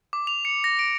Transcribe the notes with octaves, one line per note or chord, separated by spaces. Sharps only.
D6
F7
C#7
A#6
D7